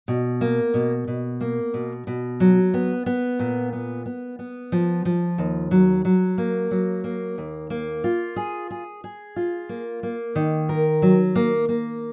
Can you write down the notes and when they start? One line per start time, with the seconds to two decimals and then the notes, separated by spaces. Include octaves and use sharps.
0.08 B2
0.41 A#3
0.74 B2
1.08 B2
1.41 A#3
1.74 B2
2.07 B2
2.40 F#3
2.74 B3
3.06 B3
3.39 A#2
3.73 B3
4.06 B3
4.39 B3
4.72 F3
5.05 F3
5.38 D#2
5.71 F#3
6.05 F#3
6.38 A#3
6.71 F#3
7.04 A#3
7.38 D#2
7.70 A#3
8.04 F4
8.36 G#4
8.70 G#4
9.04 G#4
9.36 F4
9.69 A#3
10.03 A#3
10.35 D#3
10.69 A#4
11.02 F#3
11.35 A#3
11.69 A#3